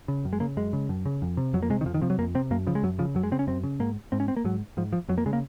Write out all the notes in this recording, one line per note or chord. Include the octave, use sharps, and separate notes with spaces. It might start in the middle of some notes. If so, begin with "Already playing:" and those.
C#3
F#2
G#3
C#3 A#3
F#2 G#3
C#3
F#2
C#3
F2
C3
F2 F#3
A#3
C3 G#3
D#3
F2 F3
D#3
C3 F3
F#3
F2 A#3
C3 C4
F#2 A#3
C#3 F3
G#3
F#2 F#3
C#3 F3
F#2 F#3
G#3
C#3 C4
C#4
F#2 C4
C#3
G#2 A#3
G#2 C4
C#4
C4
A#3
G#2 F#3
G#2 F3
F3
F2 F#3
A#3
C#3 G#3
A#3